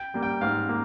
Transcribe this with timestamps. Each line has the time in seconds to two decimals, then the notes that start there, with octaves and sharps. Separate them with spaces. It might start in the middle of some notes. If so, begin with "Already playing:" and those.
Already playing: G5
0.14 G3 A#3
0.23 G5
0.41 G#2 F5
0.69 A#3